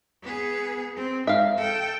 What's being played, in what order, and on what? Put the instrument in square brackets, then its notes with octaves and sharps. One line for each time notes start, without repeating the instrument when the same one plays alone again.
[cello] B3 G#4
C4
[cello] G#2 [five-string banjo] E5 F5
[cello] A4 G5